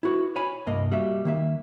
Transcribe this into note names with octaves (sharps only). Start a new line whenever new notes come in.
E4 F#4 B4
C#5 G#5 B5
C2 G2 A#3 D#5
G3 A#3 F#4 E5
D#3 A#3 E5